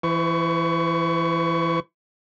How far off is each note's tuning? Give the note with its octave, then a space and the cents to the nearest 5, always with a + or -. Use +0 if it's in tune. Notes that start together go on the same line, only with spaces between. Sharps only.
E3 +15 C5 -40 C#6 +20